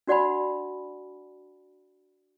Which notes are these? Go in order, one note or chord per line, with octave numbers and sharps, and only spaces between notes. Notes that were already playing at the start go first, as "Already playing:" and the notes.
D4 F#4 D5 F#5 G#5 B5